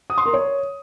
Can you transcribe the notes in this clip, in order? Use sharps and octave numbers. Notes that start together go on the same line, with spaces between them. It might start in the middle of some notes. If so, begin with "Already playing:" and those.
D#6
C6
A#4
C#5